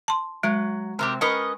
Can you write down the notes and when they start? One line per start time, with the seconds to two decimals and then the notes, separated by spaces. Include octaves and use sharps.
0.08 A5 C6
0.43 F#3 G#3
0.99 C3 C4 G4 A#4
1.21 C#4 A#4 B4 D#5 C#6